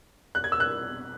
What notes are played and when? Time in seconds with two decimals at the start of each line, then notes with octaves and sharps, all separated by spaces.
0.35 F#6
0.44 G#6
0.52 E6
0.60 F#6